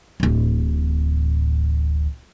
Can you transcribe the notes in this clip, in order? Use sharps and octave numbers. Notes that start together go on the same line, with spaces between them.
D1 A1